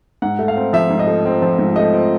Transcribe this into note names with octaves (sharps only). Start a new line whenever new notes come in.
G#2 F#5
A3
F5
C4
F3 E5
G#2
D#5
A3
C4
F3
G#2
A3 D#5
C4